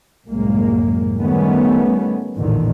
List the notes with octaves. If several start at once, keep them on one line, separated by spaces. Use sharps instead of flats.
C2 F#2 A2 G#3 A#3
D#3 G3 A3 B3 C#4
A1 E2 A#2 D3 D#3